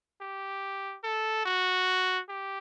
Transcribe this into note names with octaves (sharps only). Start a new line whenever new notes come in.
G4
A4
F#4
G4